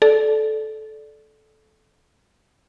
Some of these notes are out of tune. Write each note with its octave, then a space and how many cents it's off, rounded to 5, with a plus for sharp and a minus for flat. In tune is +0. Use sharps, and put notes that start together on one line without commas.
A4 -15 D5 +0